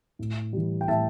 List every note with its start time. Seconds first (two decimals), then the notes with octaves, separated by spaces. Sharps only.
0.19 A2
0.53 E3 G3
0.81 G5
0.88 A2 E5 A5